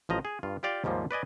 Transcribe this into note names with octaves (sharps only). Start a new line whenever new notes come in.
A1 F3 D#5 A#5
G#4
G2 F4
F4 G4 D5 F5 G5
D#2 G#2 F3 G3 A#3
B4 D5 D#5 G#5